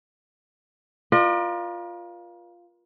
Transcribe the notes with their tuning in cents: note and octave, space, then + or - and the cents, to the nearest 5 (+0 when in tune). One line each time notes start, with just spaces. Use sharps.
F4 +0 A#4 +40 D5 +45